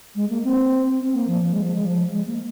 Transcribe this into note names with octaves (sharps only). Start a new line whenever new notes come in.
G#3
A#3
C4
C4
A#3
F3
F3
G#3
F3
G#3
F3
G#3
A#3